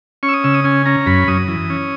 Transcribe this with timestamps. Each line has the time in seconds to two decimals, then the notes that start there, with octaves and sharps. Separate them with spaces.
0.23 C#4 C#6
0.29 E6
0.33 D#6
0.44 C#3 E6
0.54 D#6
0.64 C#4 G#5
0.85 C#4 A#5
1.06 F#2 B5
1.28 F#2 D#6
1.48 E3
1.70 C#4